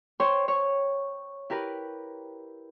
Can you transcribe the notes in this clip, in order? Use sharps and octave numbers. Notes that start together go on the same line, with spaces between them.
C5 C#5 G5 C6
C#5
E4 G4 A#4 B4